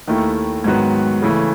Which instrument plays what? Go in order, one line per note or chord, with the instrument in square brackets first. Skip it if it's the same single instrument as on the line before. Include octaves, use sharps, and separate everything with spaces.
[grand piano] D#2 D#3 A3 E4
G#2 D#3 F#3 B3 F#4
C#3 E3 A3